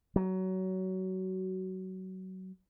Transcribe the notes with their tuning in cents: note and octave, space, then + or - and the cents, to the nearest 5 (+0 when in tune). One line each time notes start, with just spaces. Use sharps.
F#3 +20